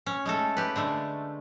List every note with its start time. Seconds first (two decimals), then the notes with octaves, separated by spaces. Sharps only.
0.06 C#4
0.26 G#3 A3 A4
0.57 G4 B4
0.76 D3 G#3 A3